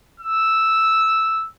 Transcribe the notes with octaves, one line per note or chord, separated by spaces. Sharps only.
E6